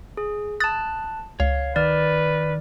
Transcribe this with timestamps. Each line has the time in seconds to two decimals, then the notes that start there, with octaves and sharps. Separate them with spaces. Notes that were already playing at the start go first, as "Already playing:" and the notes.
0.17 G#4
0.60 A5 D#6 F#6 A6
1.40 C#2 C#5 F5
1.76 D#3 B4 D5 F6